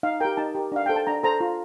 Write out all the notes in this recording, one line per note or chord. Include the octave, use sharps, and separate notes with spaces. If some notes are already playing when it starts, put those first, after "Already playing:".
D#4 F5
G4 A#4 G5
D#4 A5
G4 A#4
D4 F5
A4 C5 G5
A5
D4 A#5
A4 C5 A#5
F4